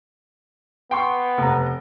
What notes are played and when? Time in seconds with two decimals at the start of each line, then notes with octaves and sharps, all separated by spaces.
0.91 B3 G5 C6 C#6
1.38 F1 A#5